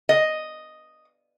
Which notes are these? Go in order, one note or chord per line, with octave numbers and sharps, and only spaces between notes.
D#5